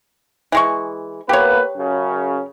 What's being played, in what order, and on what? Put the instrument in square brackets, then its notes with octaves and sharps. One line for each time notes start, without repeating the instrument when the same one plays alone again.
[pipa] E3 G#3 C#6
[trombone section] A#3 B3 B4 [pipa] G4 C#5
[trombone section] F#2 C#3